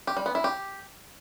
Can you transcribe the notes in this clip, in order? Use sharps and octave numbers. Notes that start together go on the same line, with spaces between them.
G4
G3
B3
E4
G4